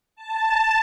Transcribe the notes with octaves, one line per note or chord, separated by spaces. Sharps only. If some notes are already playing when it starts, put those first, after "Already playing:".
A5